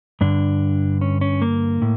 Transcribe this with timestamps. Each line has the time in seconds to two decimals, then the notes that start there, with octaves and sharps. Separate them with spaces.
0.21 G2 D3 D4
1.01 C#4
1.21 C#4
1.42 A#3
1.82 A2